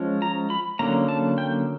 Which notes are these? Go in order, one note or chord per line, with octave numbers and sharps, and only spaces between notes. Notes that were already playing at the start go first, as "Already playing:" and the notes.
Already playing: F3 G#3 C#4
A#5
B5
D3 F#3 A#3 C#4 A#5
A5
G5